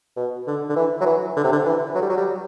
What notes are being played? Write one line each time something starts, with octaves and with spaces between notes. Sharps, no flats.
B2
D3
D3
E3
F#3
E3
D3
C3
D3
E3
F#3
G3
F#3
G3